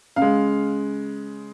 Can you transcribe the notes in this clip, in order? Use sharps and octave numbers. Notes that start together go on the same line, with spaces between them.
C#3 F5
G#3